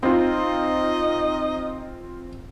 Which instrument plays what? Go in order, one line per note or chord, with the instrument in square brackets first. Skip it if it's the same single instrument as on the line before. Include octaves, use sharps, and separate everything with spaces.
[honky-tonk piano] C4 F4 [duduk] D#4 [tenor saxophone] D#5